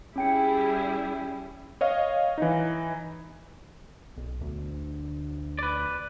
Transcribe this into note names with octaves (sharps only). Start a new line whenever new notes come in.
G3 C#4 E4 G#4 G5 C#7
C#5 D#5 F5
E3 D#4
B1
D2
B4 D5